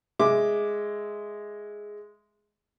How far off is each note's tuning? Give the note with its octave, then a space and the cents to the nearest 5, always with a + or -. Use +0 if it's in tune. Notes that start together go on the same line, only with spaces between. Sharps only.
G#3 +0 E5 +0 D6 +5